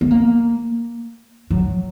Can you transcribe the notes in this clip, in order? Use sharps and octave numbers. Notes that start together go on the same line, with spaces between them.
B3
A#3
F#3